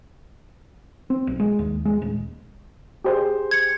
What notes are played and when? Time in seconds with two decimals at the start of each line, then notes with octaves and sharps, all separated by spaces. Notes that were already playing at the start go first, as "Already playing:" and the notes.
1.10 C4
1.27 B1
1.40 G#3
1.59 D#2
1.85 G#3
2.02 D#1
3.04 G4 G#4 C5
3.51 G#6 C#7